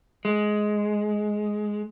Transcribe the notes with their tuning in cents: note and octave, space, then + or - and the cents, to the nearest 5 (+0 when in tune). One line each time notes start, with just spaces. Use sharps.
G#3 +10